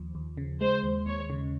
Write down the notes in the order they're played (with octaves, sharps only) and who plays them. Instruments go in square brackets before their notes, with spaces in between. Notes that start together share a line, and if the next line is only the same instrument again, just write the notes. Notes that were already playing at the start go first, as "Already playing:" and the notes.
Already playing: [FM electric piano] D#2 F3
D#2
C#3
[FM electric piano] G#3 [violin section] C5
[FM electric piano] D#2
[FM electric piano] D#2 [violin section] C#5
[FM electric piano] C#3